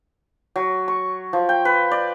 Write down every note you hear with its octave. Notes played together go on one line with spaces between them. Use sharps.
F#3
C#6
F3
G5
B4
D5